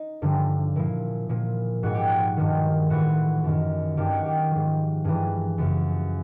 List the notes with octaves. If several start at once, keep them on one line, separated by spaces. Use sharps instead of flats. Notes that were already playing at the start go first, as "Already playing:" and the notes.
Already playing: D#4
G2 D3 F3
A#2 F3 E4
A#2 F3
G#2 F3 F#4
G4
F#4
G2 D#3
A2 E3 F#4
F#2 D#3
G2 D#3 G4
F#4
G4
G#2 F3
G2 E3 G#4
F#2 C#3 F3